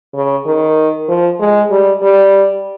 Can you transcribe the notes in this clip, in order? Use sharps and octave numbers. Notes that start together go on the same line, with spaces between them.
C#3
D#3
F3
G#3
G3
G3